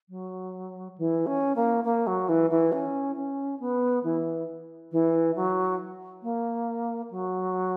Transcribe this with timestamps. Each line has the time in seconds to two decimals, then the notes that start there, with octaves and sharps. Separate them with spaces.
0.09 F#3
0.97 E3
1.26 C#4
1.56 A#3
1.84 A#3
2.07 F#3
2.28 E3
2.50 E3
2.72 C#4
3.15 C#4
3.60 B3
4.03 E3
4.92 E3
5.35 F#3
6.23 A#3
7.10 F#3